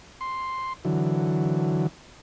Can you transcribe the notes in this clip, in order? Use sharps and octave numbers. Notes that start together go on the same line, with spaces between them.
C6
D3 E3 F#3